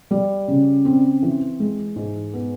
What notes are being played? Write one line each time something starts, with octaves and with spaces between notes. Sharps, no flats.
G3
C#3
C4
E3
G#3
G#2
B3